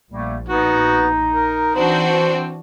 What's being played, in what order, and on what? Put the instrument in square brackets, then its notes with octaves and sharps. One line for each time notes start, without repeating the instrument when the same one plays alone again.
[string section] A#1 [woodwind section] G3 A3 A#3
[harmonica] B3 F#4 [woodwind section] D#4
[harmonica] A#4
[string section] E3 D4 F#4 [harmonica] C4 C5